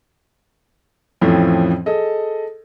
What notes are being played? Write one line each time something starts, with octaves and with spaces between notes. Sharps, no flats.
F2 A2 E3 F3 C4 C#4
G#4 A4 D#5